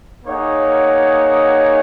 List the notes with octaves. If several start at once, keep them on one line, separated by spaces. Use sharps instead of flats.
A#3 D#4 G#4 C#5 F#5